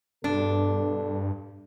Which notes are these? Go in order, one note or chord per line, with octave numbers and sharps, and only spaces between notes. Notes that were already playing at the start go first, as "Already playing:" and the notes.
G2 B2 D4 A4